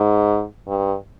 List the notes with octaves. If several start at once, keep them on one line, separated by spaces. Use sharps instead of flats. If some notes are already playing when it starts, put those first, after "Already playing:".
Already playing: G#2
G2